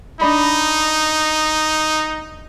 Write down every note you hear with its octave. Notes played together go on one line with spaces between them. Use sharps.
D4 D#4 D#5 B5